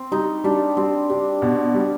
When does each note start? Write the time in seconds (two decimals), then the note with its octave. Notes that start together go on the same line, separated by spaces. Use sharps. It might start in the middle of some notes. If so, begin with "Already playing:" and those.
Already playing: C4
0.12 G3 D#4
0.44 G3 D4
0.77 G3 C4
1.10 D4 G4
1.42 B2
1.75 G3